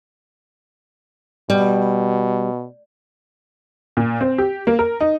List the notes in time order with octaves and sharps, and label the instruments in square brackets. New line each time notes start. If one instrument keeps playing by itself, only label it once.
[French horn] B2 [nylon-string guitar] G3
[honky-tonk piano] A#2
C4
G4
A#3
A#4
D#4